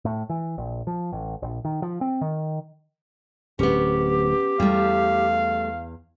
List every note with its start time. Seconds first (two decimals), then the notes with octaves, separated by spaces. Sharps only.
0.05 A2
0.29 E3
0.58 A#1
0.87 F3
1.12 A1
1.42 A#1
1.65 D#3
1.82 F3
2.01 C4
2.21 D#3
3.59 D1 B3 C#4 G4
4.60 E2 G3 A3 F5